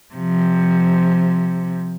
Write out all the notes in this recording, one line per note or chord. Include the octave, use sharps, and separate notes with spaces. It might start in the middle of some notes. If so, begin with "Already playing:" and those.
C3 F3